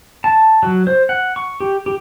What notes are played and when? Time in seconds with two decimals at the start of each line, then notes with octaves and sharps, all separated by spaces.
0.24 A5
0.63 F#3
0.87 C5
1.09 F#5
1.36 C#6
1.60 G4
1.86 G4